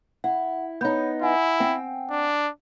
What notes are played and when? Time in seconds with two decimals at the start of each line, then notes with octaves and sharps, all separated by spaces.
0.24 E4 F#5
0.81 B3 D#4 C#5 B5 G6
1.22 E4 F#5 G#5
1.60 C4 G5
2.10 D4